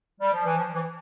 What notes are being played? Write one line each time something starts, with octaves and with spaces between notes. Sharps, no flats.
G3
F3
E3
F3
E3